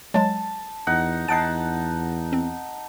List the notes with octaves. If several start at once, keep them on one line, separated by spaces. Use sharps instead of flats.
F#3 G#3 A5
E2 D#4 F#5
E2 D#4 F#5 A5 C7 D7
C4